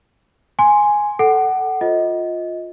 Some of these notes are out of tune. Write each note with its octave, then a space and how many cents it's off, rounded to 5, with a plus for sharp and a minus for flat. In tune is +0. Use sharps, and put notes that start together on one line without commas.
G#5 +0 C6 +0
A4 +0 F#5 +20
F4 +15 C5 +0 D#5 +20